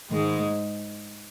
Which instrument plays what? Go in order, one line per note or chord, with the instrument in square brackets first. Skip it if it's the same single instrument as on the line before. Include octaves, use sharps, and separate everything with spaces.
[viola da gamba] G#2 G#3 [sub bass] D#3